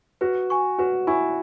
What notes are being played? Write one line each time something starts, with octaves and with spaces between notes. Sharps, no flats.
F#4 B4
G#5 C#6
F#4 B4
E4 G#5 C#6